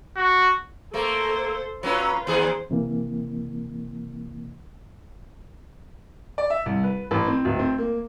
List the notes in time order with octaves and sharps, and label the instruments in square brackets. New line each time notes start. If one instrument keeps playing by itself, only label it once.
[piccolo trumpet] F#4
[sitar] A3 A#3 [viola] A4 C5
[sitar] F#3 C#4 [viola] F4 B4
[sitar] D#2 G#4 [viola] C5
[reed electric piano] F#2 C3 E3 A#3
[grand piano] D5
E5
C2
B4
A1
C4
D1
C4
A#3